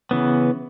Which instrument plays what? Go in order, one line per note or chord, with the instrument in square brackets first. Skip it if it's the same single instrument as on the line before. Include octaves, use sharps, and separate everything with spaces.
[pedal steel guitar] C#3 E3 B3